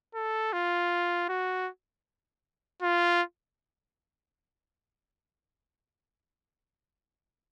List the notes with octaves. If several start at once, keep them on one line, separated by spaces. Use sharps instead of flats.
A4
F4
F#4
F4